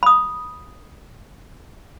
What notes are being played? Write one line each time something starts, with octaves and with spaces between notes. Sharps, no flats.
B5 D#6